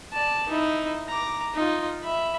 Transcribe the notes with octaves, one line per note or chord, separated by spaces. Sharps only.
D5 A5
D#4 E4
A#5 D6
D#4 F4
E5 B5